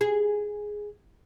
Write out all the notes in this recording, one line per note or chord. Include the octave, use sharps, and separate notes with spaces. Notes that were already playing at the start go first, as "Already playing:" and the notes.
G#4